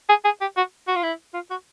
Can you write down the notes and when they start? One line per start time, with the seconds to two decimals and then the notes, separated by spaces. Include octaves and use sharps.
0.09 G#4
0.25 G#4
0.41 G4
0.57 F#4
0.88 F#4
0.96 F4
1.03 E4
1.34 F4
1.50 F#4